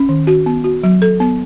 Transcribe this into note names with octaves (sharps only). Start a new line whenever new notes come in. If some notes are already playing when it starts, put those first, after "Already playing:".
Already playing: C#4
D#3
F#4
B3
F#4
F#3
A4
B3